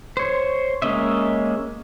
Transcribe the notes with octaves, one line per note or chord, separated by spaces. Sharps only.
C5 C#5
G#3 A#3 C#4 D#5 E5